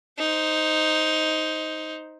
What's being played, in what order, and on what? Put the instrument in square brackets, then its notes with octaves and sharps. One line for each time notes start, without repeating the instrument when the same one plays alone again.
[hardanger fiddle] D#4 C5